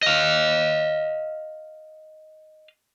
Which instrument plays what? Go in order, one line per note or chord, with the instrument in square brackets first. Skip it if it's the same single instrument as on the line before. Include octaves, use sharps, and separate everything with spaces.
[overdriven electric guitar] D#5 F5